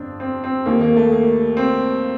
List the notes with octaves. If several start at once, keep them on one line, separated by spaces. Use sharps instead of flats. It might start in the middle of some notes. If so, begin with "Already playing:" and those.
Already playing: G1 F2 F3 C4 D4
C4
C4
D#2 D#3 A#3
A#3
A3
A#3
C4